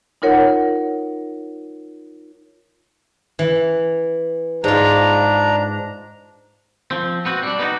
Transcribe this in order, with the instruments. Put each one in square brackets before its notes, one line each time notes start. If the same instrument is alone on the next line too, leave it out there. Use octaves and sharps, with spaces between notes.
[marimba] D#4 F4 A#4 C#5 F#5
[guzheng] E3
[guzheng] G#2 F4 [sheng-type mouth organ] D4 A#5
[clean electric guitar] F3 C4
B3 C4 F#4
G3 D4
B3 D#4 E4 F#4